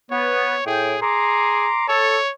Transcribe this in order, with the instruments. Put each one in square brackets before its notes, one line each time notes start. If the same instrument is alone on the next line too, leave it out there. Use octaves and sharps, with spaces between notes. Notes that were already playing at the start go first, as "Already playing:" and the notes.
[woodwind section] B3 [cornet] C#5
[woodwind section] A2 G5 [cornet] G#4
[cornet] G#4 [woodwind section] A#5 C6 D6
[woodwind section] A4 [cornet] C#5